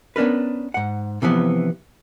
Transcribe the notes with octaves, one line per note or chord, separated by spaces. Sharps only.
B3 C#4 D4 A#4 B4
G#2 F#5
C3 E3 F3 B3